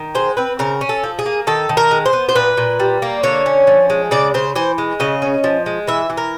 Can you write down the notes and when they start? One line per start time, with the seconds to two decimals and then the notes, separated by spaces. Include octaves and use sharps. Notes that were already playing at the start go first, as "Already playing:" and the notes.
Already playing: D#3
0.15 G#3 C5
0.37 C4 B4
0.59 C#3 A#4
0.81 C#4
0.89 A4
1.04 F3
1.19 G#4
1.26 A#3
1.47 D#3 A4
1.69 D#3
1.77 A#4
1.91 G#3
2.06 C5
2.13 B3
2.29 C5
2.35 A#2 B4
2.57 A#2
2.80 G3
3.02 A#3
3.23 D3 C#5
3.46 C#4
3.67 F3
3.90 G#3
4.11 C#3 D5
4.34 C#3 C5
4.56 E3 C5
4.78 G#3
5.00 C#3 D#5
5.22 C#4
5.44 F3
5.66 G#3
5.87 E3 E5
6.10 E3
6.17 A#4